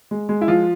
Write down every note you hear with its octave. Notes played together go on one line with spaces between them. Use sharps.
G#3
G#3
E4
F3 F4